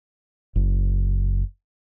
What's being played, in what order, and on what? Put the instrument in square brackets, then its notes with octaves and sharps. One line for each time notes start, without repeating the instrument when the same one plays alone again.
[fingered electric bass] F#1